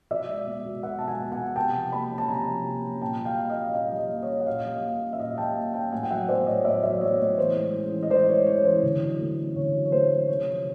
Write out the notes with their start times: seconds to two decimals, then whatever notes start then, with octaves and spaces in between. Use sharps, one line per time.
0.11 B2 D5 E5
0.29 G#3
0.47 B3
0.65 B2
0.83 B2 E5 F#5
0.99 G#3 A5
1.08 F#5 G#5
1.20 B3
1.32 F#5 G#5
1.38 B2
1.56 C3 G5 A5
1.74 F3
1.92 A#3 A5 B5
2.11 C#4
2.18 A5
2.28 C3 G#5 A#5
2.47 F3
2.65 A#3
2.83 C#4
3.02 A#2 G5 A5
3.20 G3
3.25 F5 G5
3.38 A#3
3.50 D#5 F5
3.56 C#4
3.74 A#2 D#5 F5
3.92 G3
3.98 D#5 F5
4.10 A#3
4.23 C#5 D#5
4.29 C#4
4.40 F#5
4.47 A#2 D#5 F5
4.66 G3
4.83 A#3
5.01 C#4
5.13 E5
5.20 A#2 D#5 F5
5.38 G3 G5 A5
5.56 A#3
5.74 C#4 G5 A5
5.92 A2 F#5 G#5
6.03 G5
6.10 F#3 E5 F#5
6.28 B3 C5 D5
6.47 A2 C#5 D#5
6.65 A2 D5 E5
6.83 F#3 D5 E5
7.01 B3 C#5 D#5
7.19 A2 C#5
7.38 E3 C5
7.55 G#3
7.74 C#4
7.92 E3
8.03 D#5
8.10 E3 C5 D5
8.29 G#3 C#5
8.47 C#4 C#5
8.65 E3 C5
8.83 D3
9.01 F#3
9.19 A3
9.38 C#4
9.56 D3 C#5
9.74 F#3
9.86 C#5
9.92 A3 C5
10.10 C#4
10.28 C3 C#5
10.47 F3